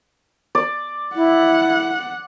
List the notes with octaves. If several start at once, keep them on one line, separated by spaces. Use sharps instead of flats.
D5
E4 F#5